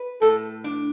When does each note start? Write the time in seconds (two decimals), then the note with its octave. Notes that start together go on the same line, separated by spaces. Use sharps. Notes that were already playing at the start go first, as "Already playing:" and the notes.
Already playing: B4
0.22 A2 A4
0.64 D4